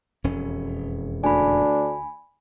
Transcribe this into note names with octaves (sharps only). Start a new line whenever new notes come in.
E1 F2 C#4
D2 D4 G#5 B5